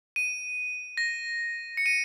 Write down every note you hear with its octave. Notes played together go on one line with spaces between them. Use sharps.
D#7
A#6
C#7
D#7